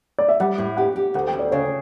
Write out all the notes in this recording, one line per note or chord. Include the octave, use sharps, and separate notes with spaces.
D5
E5
G3 F#5
A2
G4 F#5
G4
D2 F#5
G5
D2
D5
C#3 C#5